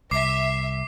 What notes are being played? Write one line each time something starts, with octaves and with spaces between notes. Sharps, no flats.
C2 E5 D6 C7